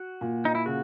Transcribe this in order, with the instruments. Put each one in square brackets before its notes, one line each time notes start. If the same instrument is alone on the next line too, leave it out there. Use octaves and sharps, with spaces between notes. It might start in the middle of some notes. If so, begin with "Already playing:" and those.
Already playing: [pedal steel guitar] F#4
[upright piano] A#2
[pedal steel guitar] D#4
E4
[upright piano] C#3 [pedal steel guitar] F#4